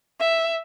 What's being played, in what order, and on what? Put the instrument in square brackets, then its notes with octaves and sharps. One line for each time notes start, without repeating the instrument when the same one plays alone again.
[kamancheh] E5